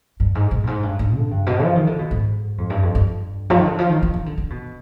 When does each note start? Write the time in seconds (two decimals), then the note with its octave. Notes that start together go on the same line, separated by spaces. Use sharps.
0.20 G2
0.35 G#2
0.51 B2
0.64 G2
0.67 G#2
0.83 G2
0.99 G#2
1.16 D3
1.31 G2
1.47 B2
1.64 F3
1.75 D#3
1.87 D3
1.99 B2
2.11 G#2
2.58 F2
2.70 G2
2.83 F2
2.95 G2
3.50 F3
3.57 D#3
3.65 D3
3.79 F3
3.89 D#3
4.03 D#3
4.14 D#3
4.26 D3
4.38 D3
4.50 B2